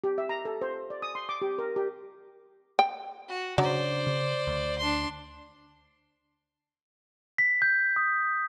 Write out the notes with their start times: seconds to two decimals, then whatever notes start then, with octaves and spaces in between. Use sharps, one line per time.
0.04 G4
0.18 E5
0.29 A#5
0.45 A4
0.62 C5
0.90 D5
1.02 D#6
1.15 C6
1.29 D6
1.42 G4
1.58 A#4
1.76 G4
2.79 G5
3.28 F#4
3.58 C#3 F#3 D4 C5 D5
4.07 C#3
4.47 D2
4.78 D4 C6
7.38 B6
7.62 G6
7.96 D#6